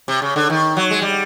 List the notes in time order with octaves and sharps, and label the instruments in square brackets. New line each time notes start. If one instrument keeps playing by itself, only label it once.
[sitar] C3
C#3
D3
D#3
F#3
G#3
G3